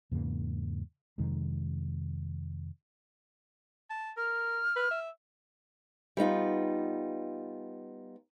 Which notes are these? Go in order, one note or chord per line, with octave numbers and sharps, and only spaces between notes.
E2 G#2 C#3 A#3
F2 C3 D#3 G#3
A5
A#4 F6
B4
E5
G3 B3 D#4 F4